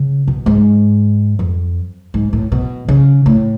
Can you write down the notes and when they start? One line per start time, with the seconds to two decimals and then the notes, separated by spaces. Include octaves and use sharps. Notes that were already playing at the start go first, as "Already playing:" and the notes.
Already playing: C#3
0.27 B2
0.46 G#2
1.39 F2
2.14 G#2
2.33 A2
2.52 B2
2.89 C#3
3.26 A2